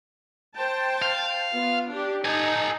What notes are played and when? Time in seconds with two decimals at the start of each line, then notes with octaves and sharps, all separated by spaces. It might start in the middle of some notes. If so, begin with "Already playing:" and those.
0.54 C5 G5 A5
1.02 F5
1.53 B3 F4
1.91 D4 G4
2.25 D#4 A4 G#5